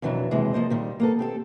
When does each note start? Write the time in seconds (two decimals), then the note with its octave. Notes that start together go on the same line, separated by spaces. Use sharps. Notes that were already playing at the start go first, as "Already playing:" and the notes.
0.02 F2 B2 D#3 E3 F#3 D4
0.31 D#2 C3 E3 G#3
0.53 F3 A#3 C5 D#5
0.70 A#2 D#3 G3
1.00 A#3 B3 A4
1.19 C4 G4 A4